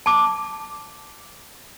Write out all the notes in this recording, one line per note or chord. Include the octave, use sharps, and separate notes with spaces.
A5 D6